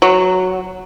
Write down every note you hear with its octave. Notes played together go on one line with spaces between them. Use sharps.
F#3